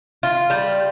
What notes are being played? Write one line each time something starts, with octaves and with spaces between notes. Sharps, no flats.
F4
G3